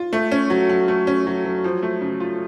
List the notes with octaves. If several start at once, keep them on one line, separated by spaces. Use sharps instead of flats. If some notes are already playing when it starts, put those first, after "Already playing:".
Already playing: F4
A3
C#4
F#3
F#3
A3
C#4
F#3
F#3
F3
A3
C#3
F4